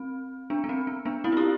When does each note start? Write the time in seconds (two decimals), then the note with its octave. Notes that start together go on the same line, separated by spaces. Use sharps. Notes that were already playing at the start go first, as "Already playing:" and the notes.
Already playing: C4
0.50 B3 D4
0.64 B3
0.69 C4
0.87 B3
1.05 B3 D4
1.24 C4 E4
1.32 F4
1.37 E4 G4